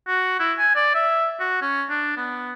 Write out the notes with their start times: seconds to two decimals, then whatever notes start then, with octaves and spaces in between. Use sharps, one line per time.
0.08 F#4
0.39 E4
0.58 G#5
0.75 D5
0.94 E5
1.40 F#4
1.61 C#4
1.89 D4
2.17 B3